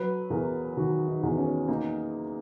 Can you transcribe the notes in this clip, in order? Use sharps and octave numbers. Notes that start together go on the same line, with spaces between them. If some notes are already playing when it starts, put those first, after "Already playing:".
Already playing: F#3 B4
E2 A#4
D#3 F#4
D#4
E2
C#4
A#3 D#4